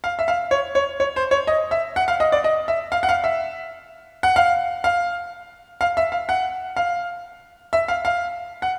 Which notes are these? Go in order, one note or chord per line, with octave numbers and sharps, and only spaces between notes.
F5
E5
F5
C#5
C#5
C#5
C5
C#5
D#5
E5
F#5
F5
D#5
D5
D#5
E5
F5
F#5
F5
E5
F#5
F5
F5
F5
E5
F5
F#5
F5
E5
F5
F5
F#5